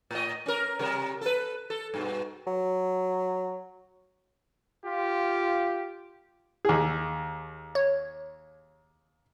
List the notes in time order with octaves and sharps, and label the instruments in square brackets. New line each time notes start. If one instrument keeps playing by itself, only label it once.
[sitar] A2 D#5
C#4 A#4
C3 G3 A#4
A4 B4
A4
G2 B2
[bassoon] F#3
[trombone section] F4 [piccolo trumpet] G4
[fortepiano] D#2 G#4
[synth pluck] C#5